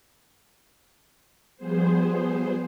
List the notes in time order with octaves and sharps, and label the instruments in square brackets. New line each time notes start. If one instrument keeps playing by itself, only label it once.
[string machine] F3 G3 B3 G#4 C5